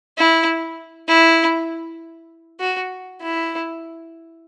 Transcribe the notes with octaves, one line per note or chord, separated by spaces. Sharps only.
E4
E4
F#4
E4